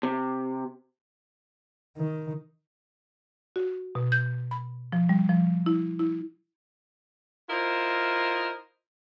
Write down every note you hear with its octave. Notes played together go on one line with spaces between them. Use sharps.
C3
D#3
F#4
B2
G6
B5
F3
G3
F3
E4
E4
E4 F4 A#4 C5 D#5